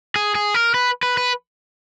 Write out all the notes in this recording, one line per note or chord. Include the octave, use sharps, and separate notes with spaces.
G#4
G#4
A#4
B4
B4
B4